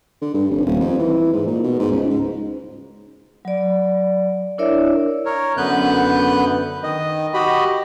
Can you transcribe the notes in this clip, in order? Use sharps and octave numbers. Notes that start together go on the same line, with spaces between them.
D3
G2
F1
D#1
F2
E3
G#2
A#2
B2
G#2
C#2
G#2
F#3 D5
D4 E4 A#4 C#5 D5 E5
A#4 C#5
F#2 D3 B3 B4 F#6 G6
D#3 D#5
F#4 G4 D#5 B5